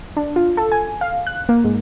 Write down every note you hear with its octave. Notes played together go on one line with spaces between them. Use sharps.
D4
F4
A4
G#5
F5
F#6
A#3
G#2